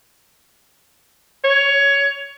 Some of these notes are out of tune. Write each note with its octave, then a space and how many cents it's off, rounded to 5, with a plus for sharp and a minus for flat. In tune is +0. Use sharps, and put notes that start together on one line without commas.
C#5 +15